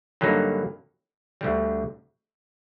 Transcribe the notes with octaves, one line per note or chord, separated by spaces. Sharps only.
G2 D3 F#3 A#3 D#4
D2 D3 G3